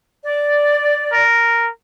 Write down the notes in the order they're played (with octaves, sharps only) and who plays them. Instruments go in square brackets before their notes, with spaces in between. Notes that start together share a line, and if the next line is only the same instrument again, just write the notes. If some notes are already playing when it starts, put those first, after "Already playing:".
[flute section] D5
[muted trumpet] A#4